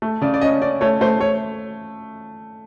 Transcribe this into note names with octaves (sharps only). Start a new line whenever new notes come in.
A3
C#3 D5
D5
C#4 D#5
C#4 D5
A3 C#5
A3 C5
A3 C#5